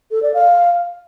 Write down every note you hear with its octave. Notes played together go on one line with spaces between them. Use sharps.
A4
D5
F5